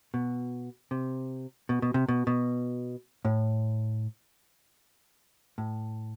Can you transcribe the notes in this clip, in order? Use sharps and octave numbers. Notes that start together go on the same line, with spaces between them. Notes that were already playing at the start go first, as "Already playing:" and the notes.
B2
C3
B2
B2
C3
B2
B2
A2
A2